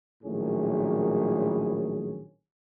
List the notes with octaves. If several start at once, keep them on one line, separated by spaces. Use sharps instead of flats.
A#1 A2 D#3 F#3 C#4 G#4